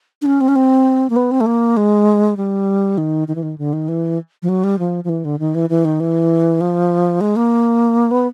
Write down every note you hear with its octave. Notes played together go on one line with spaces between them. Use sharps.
D4
C#4
C4
C#4
C4
A#3
B3
C4
A3
A#3
G#3
G3
D#3
D#3
E3
D#3
D3
D#3
E3
F3
F#3
G3
F3
F3
E3
D3
D#3
E3
E3
D#3
E3
F3
G#3
A#3
B3